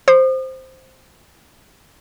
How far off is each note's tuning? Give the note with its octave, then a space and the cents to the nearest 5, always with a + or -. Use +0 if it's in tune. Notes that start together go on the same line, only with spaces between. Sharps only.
C5 +0 D#6 -40